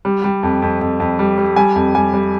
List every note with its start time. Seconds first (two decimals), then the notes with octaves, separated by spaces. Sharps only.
0.05 G3
0.24 G3
0.43 F2
0.62 F2
0.81 F2
1.00 F2
1.19 G3
1.38 G3
1.56 G3 G#5
1.75 F2
1.95 G3 G#5
2.13 G3